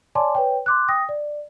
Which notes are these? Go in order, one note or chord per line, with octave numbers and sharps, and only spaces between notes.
C#5 D5 G#5 A5 C6 D6
B4 C#5 G5
C6 D6 F#6
G5 D#6 A#6
D5